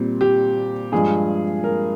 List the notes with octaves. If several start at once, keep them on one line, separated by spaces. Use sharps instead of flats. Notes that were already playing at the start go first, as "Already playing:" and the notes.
Already playing: A#2 G3 C4
G4
G2 F3 G#3 G#4
A#4